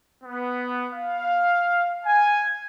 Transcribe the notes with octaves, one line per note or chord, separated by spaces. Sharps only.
B3
F5
G#5